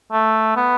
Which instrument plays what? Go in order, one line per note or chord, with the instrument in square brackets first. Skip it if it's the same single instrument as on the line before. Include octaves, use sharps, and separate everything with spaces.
[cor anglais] A3
B3